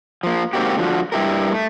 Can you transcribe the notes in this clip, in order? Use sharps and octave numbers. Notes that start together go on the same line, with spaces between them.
F3 A#3
G#2 A#3 C4 F#4 G4
D3 F3 F#4
G2 E4 G4 A#4
A3